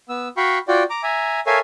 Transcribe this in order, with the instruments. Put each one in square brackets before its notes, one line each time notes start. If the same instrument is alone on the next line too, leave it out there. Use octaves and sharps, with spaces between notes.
[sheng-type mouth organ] B3 E6
F#4 F5 G5 B5 C#6
F4 F#4 D5 G5
A#5 D6
E5 G#5 A#5
A4 A#4 C#5 E5 F5 G#5